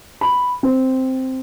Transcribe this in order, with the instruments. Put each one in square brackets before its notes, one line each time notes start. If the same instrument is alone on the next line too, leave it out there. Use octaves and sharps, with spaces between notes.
[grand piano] B5
C4